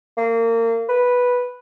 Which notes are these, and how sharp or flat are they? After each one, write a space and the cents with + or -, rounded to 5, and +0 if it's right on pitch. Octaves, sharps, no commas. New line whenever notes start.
A#3 -30
B4 -5